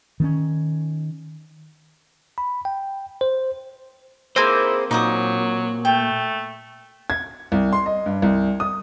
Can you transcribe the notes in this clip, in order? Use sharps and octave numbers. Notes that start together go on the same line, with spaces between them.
D#3 C4 C#4
B5
G5
C5
A#3 C4 E4 G#4 C5
A#2 F#3 D#4 D6 D#6
A3 G5
G#6
C2
C6
D#5
G2
C2
D#6